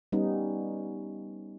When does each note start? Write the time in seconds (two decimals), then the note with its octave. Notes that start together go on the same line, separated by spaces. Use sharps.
0.12 G3 B3 C#4 D#4